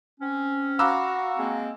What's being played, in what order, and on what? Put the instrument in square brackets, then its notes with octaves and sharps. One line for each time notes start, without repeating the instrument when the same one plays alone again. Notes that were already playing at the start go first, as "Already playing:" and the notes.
[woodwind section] C4 C#4
[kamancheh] F#4 [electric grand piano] F5 A#5 E6 [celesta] B5 D6 F#6
[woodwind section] G#3 A#3 C4